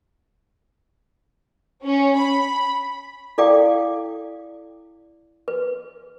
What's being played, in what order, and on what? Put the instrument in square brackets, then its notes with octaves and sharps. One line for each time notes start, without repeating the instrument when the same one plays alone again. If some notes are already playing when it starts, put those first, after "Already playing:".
[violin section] C#4
B5
[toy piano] E4 A4 D5 F5 G5 D6
B4